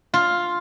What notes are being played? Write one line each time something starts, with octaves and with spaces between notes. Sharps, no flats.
F4